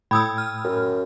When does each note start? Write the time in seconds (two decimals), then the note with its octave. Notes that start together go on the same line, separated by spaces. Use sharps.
0.11 A2 G5 B5 D#6 E6 G#6
0.38 F6
0.64 F#2